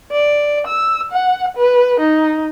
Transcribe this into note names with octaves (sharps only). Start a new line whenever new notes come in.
D5
E6
F#5
B4
D#4